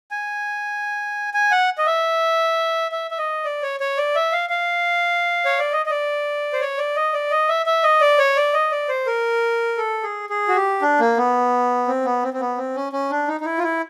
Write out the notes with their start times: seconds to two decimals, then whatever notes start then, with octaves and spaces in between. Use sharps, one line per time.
0.11 G#5
1.34 G#5
1.51 F#5
1.78 D#5
1.87 E5
2.92 E5
3.11 E5
3.18 D#5
3.45 D5
3.63 C#5
3.80 C#5
3.97 D5
4.15 E5
4.32 F5
4.50 F5
5.45 C#5
5.59 D5
5.73 D#5
5.86 D#5
5.91 D5
6.53 C5
6.61 C#5
6.78 D5
6.96 D#5
7.13 D5
7.31 D#5
7.49 E5
7.66 E5
7.83 D#5
8.01 D5
8.19 C#5
8.36 D5
8.54 D#5
8.72 D5
8.89 C5
9.06 A#4
9.77 A4
10.03 G#4
10.30 G#4
10.48 F#4
10.56 G4
10.82 D4
11.00 A#3
11.17 B3
11.87 C4
12.05 B3
12.23 C4
12.34 C4
12.41 B3
12.58 C4
12.76 C#4
12.93 C#4
13.10 D4
13.28 D#4
13.40 D#4
13.45 E4
13.58 F4
13.63 E4